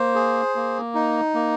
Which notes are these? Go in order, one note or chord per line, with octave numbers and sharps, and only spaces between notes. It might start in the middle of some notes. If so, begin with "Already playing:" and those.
Already playing: A#3 C5
G#4
A#3
D#4
A#3